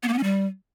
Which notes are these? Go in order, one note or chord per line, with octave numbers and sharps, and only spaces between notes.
B3
A#3
B3
C#4
G3